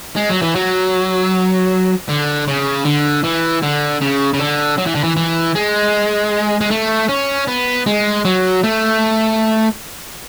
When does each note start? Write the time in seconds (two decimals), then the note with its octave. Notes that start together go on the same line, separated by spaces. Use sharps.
0.16 G#3
0.30 F#3
0.42 E3
0.55 F#3
2.09 D3
2.48 C#3
2.85 D3
3.24 E3
3.63 D3
4.02 C#3
4.34 C#3
4.40 D3
4.78 F#3
4.86 E3
4.95 D3
5.04 E3
5.17 E3
5.55 G#3
6.61 G#3
6.71 A3
7.09 C#4
7.48 B3
7.86 G#3
8.25 F#3
8.64 A3